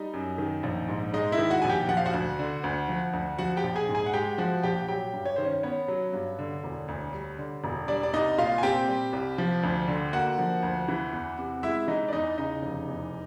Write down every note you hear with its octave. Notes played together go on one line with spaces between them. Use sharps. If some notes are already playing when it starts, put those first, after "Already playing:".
Already playing: G3 D#4 D#5
F#2
D#3
A#1
G#2
G#3 D#4 D#5
E4 E5
D#3
F#4 F#5
A#1 G#5
G4 G5
F3 F#5
F5
F#4 F#5
D2
D3
D2
F3
D2
F3 F#4 F#5
G4 G5
A#1
G#4 G#5
G#2
G#4 G#5
F#5
G#3 G4 G5
F3 F#4 F#5
A#1 G4 G5
F#3 G4 G5
G2
C#5
D#3 C5
C#4 C#5
B3 C#4 C#5
F#3
G2
D3
E1
D2
G3
D3
E1
G3 D4 D5
D5
C2 D#4 D#5
A#2 F4 F5
G#5
C4 G4 G5
G3
C2
F3
D2
D3
A#3 F#4 F#5
F3
D2
E3
E2
C3
G#3 E4 E5
E3 D#4 D#5
D5
E2 D#4 D#5
C#3 D#4 D#5
F1
E2